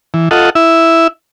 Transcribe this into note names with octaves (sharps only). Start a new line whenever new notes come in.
E3
F4 A4 D#5 F#5
E4 E5